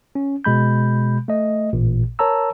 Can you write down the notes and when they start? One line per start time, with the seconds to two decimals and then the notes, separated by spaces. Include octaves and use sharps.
0.15 C#4
0.44 B2 G#3 B5 G6
1.28 A3 D#5
1.73 A1 A#2
2.19 A#4 C#5 A5 A#5 E6